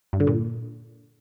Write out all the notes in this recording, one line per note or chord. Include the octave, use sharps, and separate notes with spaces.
G2
D3
A#2